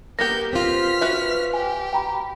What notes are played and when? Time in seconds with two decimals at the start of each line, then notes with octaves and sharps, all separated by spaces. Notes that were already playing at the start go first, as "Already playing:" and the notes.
0.19 A#3 B3 G4 A#4 G6 A#6
0.53 C4 F4 F6 B6
1.01 F#4 B4 E5
1.54 G4 G#5
1.93 G5 A#5 B5